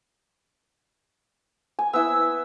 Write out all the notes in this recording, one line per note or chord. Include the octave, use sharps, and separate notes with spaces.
G#5
B3 E4 E6